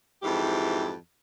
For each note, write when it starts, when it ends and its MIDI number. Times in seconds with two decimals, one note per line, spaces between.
0.23 0.93 41
0.23 0.93 44
0.23 0.93 52
0.23 0.93 64
0.23 0.93 67